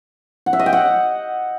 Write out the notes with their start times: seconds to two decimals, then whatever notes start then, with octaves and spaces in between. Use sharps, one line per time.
0.46 F#5
0.53 E5
0.59 D#5
0.66 G5
0.73 F#5